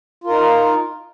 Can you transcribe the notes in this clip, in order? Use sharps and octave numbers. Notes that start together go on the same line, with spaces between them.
D#4 F4 A#4